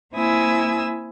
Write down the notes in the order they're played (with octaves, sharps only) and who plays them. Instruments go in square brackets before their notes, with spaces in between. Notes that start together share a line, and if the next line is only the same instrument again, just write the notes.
[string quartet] A#3 C4 E4 G#5 D#6 E6